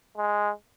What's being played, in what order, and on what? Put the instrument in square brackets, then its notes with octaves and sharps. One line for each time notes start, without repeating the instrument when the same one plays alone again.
[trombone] G#3